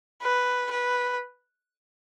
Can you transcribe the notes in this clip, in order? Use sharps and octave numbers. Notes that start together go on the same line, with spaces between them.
B4
B4